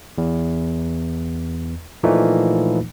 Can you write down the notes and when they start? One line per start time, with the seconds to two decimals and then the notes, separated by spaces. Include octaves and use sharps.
0.18 E2
2.03 A#2 E3 F3 A3 A#3 D#4